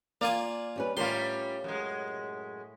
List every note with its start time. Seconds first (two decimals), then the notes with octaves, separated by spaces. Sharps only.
0.21 A#3 F4 D5 G#5
0.76 G3 C#4 B4
0.97 A2 G3 C#4 F4 A#4 C6
1.64 F#2 G#3